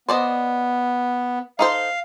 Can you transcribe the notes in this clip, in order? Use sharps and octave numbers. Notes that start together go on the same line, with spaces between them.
B3 C5 D5 D#5
D#4 A4 C5 F5